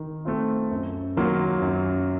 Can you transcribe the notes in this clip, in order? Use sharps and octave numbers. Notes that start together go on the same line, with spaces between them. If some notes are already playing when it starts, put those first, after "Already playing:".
Already playing: D#3
A3 C4 F4
F#2
D#3 F#3 A#3 F4
F#2